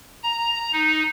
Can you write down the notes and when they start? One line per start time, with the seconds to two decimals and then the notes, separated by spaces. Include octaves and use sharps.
0.23 A#5
0.73 D#4